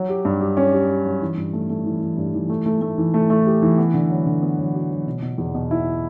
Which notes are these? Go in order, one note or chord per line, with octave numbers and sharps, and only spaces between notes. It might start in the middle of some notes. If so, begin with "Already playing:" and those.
Already playing: F#3
G4
G2
G4
C#4
G4
G4
F#3
E3
G2
A3
A3
E3
E3
G2
E3
A3
A3
A3
E3
A3
A3
G4
E3
B3
D3
F#3
D3
B3
F#3
F#4
F#3
B2
B2
E2
B2
E4